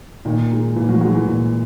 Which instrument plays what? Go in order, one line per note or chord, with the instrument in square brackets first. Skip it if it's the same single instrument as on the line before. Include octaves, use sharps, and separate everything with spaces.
[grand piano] A#2 [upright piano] D#3
[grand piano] G#3 D#4
[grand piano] A#2 [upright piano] E3
[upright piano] F#3
[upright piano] F#3 [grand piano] G#3 D#4
[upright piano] E3
[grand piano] A#2